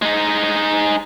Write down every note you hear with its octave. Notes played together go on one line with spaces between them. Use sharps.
G#3 D#4